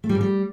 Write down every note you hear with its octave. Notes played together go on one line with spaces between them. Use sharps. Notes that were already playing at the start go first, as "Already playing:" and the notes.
A3
G3
G#2
G3